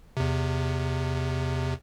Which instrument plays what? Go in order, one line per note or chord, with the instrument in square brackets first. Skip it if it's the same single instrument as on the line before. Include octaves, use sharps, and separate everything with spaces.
[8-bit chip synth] E2 C3